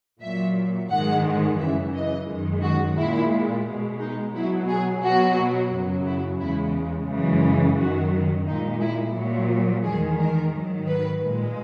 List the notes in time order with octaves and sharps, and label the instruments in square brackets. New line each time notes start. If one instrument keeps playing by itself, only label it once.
[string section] A#2 F#3 E5
G#2 D#3 G#3 F#5
F#2 C#3 E3 E5
D#5
F#2 D#3 G#3
F#4
A#2 G#3 E4
B2 G#3
D#4
B2 F#3 E4
G#4
B2 F#3 F#4
F#2 C#3 F#3
E4
E2 C#3 G#3 E4
F#2 C#3 E3 G#3
F#2 D#3 F#3 F#4
A#2 G#3 D#4
E4
A#2 F#3
E2 D#3 G#3 G#4
A#4
G#2 D#3 F#3
B4
A#2 G#3